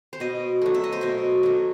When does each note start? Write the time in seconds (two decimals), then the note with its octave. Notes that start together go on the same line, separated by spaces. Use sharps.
0.13 C5
0.20 B2 D#5
0.62 F#3 A3
0.74 E5
0.84 D#5
0.92 C5
1.01 B2 D#5
1.43 F#3 A3